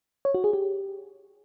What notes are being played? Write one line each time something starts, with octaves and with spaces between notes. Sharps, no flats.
C#5
F#4
G#4
G4